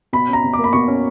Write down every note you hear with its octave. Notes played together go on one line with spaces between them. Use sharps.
B2 B5
C#4 A#5
B2
D6
A#3
B5
B2 C#6
C#4